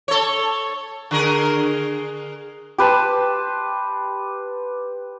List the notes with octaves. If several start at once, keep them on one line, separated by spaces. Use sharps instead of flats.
A4 C#5
D3 G#4 A#4
G4 B4 C5 A5